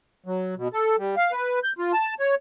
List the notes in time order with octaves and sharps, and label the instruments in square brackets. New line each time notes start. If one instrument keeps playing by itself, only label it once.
[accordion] F#3
B2
A4
G3
F5
B4
G6
F4
A5
C#5